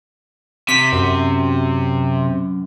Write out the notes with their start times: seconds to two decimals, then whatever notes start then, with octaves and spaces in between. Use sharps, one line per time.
0.68 C3 B6
0.93 F#2